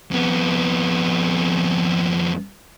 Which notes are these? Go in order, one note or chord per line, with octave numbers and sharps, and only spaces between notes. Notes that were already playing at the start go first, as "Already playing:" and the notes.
F2 B3